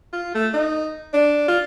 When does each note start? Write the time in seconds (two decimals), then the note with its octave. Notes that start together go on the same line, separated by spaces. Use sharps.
0.13 F4
0.35 A3
0.54 D#4
1.14 D4
1.48 F4